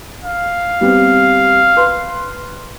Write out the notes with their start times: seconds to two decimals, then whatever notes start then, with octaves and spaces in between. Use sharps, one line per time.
0.23 F5
0.81 G3 B3 C4
1.77 B4 C6